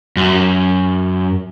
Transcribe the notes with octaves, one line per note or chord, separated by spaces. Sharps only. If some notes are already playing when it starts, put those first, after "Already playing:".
F#2